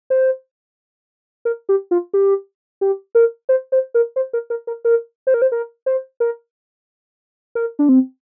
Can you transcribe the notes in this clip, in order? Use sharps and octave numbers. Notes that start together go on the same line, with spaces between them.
C5
A#4
G4
F4
G4
G4
A#4
C5
C5
A#4
C5
A#4
A#4
A#4
A#4
C5
A#4
C5
A#4
C5
A#4
A#4
D4
C4